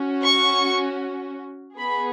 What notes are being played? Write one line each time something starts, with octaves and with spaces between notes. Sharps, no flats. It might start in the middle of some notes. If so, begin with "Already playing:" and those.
Already playing: C#4 F#4
C#6
B3 G#4 B5